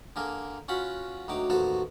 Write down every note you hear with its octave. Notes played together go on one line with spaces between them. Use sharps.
D3 A#3 G#4 A#4
C#4 F4 F#4 F#5 B5
D2 F#3 D#4 G5 D6
A1 D#2 F#3 F#4 A4 C5